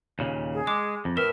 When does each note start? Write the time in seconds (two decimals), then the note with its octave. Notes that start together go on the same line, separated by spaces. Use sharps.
0.19 D#2 A#2 C#3
0.53 G#4
0.67 G#3 D6
1.05 F2
1.17 A2 A#4 B4 E5 F6